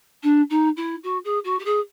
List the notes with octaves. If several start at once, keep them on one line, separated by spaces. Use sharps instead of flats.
D4
D#4
E4
F#4
G#4
F#4
G4
G#4